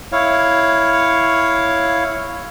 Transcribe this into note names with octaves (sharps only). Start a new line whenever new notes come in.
E4 C#5 F5